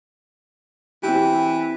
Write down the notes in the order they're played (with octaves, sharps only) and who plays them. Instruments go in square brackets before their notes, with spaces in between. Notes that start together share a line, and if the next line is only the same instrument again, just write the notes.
[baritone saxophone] E3 [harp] C4 E4 G4